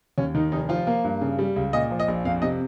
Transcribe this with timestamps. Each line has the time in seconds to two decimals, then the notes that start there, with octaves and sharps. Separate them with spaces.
0.18 D#2 C#4
0.35 D#3 D#4
0.52 F1 D#4
0.69 F3 F4
0.87 A#3
1.04 G2
1.21 C#3
1.39 G3
1.56 C#2
1.73 A#2 D#5
1.91 F3
2.00 D#5
2.08 A#1
2.25 F2 F5
2.42 C3 D#5